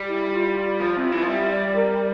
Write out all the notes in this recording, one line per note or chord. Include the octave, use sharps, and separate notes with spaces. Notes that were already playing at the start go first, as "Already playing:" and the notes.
Already playing: G3
E4
F4
F3
C3
E3
F3
G3 E5
D5
A#4